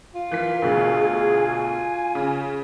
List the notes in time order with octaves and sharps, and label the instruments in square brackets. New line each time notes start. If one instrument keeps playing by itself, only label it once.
[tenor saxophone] F4
[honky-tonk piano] E3 B6 [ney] A#4
[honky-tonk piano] D2 B2 [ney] G#4
[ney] G#4
G#5
[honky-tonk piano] C#3